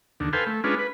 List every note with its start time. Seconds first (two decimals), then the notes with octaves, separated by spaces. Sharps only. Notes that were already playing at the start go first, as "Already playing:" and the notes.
0.20 D#2 D3
0.33 A4 B4 C5 F5 G5 G#5
0.47 A3
0.64 G#3 C#4 D4 F4 B4
0.79 B4